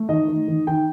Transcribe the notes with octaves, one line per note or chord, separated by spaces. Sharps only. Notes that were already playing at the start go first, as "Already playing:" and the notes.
Already playing: A3
D#3 D#5
D#3
D#3
D#3 G5